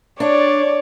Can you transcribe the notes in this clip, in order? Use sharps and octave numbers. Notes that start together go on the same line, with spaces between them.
D4 C#5 D5